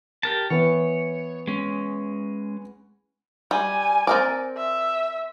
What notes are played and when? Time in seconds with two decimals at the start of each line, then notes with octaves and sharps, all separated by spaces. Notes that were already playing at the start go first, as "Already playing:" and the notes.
0.23 G4 A#4 A5
0.50 E3 B3 C#5
1.47 G#3 C#4
3.51 G3 G#5
4.07 C4 A#4 D5
4.57 E5